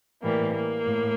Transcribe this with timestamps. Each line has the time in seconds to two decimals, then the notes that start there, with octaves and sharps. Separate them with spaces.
0.23 A2 E3 G3 A#3
0.54 A#3
0.86 A2